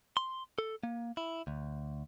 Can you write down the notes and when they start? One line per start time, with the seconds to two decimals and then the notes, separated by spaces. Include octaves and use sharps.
0.17 C6
0.59 A4
0.83 A#3
1.17 E4
1.47 D2